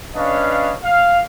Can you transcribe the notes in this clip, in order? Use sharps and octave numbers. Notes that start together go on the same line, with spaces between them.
C#4 D4 B4 C#5 D#5 F5
F5